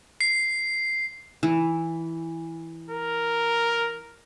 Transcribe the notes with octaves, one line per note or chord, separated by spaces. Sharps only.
C7
E3
A#4